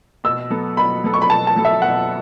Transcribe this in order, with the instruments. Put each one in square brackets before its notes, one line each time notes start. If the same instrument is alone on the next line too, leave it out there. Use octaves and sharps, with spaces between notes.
[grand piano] B2 [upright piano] E6
[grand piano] F#3 B3 A4
[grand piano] B2 [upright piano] B5
[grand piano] F#3 B3 A4
[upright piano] C#6
B5
[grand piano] B2 [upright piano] A5
[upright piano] A5
[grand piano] F#3 B3 A4
[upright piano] E5
[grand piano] B2 [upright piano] F#5